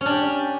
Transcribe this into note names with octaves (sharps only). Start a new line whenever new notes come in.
C#4 D4 G4